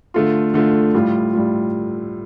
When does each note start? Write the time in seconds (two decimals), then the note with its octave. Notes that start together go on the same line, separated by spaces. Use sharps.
0.14 D3 A3 F4
0.54 D3 A3 F4
0.94 A2 G3 F4
1.33 A2 G3 F4